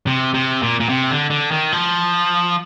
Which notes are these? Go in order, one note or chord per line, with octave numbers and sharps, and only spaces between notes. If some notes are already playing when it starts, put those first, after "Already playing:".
C3
C3
A#2
A#2
C3
D3
D3
D#3
F3